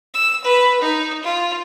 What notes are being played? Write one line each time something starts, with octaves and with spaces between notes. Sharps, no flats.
E6
B4
D#4
F4